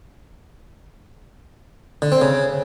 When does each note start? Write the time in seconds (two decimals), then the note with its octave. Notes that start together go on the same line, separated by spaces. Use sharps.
2.02 D3
2.12 C4
2.22 C#3